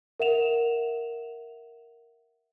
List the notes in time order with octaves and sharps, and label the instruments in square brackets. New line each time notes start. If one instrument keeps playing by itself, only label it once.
[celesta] A#4 E5 F#5 E7 F7